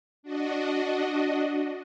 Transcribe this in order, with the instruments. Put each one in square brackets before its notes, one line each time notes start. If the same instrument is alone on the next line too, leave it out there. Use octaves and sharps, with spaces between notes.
[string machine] D4 F#4 D#5